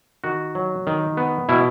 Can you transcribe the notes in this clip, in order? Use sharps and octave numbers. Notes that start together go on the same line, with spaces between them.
D#3 F#4
F#3
D#3
B3
B2 E4